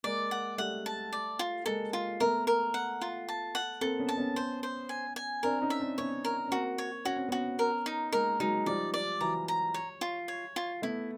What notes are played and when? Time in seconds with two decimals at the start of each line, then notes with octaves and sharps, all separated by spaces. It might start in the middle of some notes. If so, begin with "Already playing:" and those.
0.04 G#3 A#3 D5
0.31 F#5
0.58 G3 A3 F#5
0.86 A5
1.13 D5
1.39 F4
1.66 G#3 A#3 A4
1.93 F4
2.20 A3 B3 A#4
2.47 A#4
2.74 F#5
3.01 F4
3.29 A5
3.55 F#5
3.81 A#3 C4 A4
4.00 B3 C#4
4.09 A5
4.17 B3 C#4
4.36 C5
4.63 C5
4.89 G#5
5.16 G#5
5.43 C4 D4 A#4
5.62 C#4 D#4
5.70 E5
5.80 C4 D4
5.98 B3 C#4 C#5
6.25 A#4
6.47 C#4
6.51 A#3 C4 F#4
6.78 C#5
7.05 C#4 F#4
7.17 C4
7.29 B3 C#4 F#4
7.59 A#4
7.86 D#4
8.12 G#3 A#3 A#4
8.40 F#3 G#3 D#4
8.66 F3 G3 D5
8.94 D5
9.21 E3 F#3 A#5
9.48 A#5
9.74 C#5
10.01 F4
10.28 C#5
10.56 F4
10.82 A3 B3 E4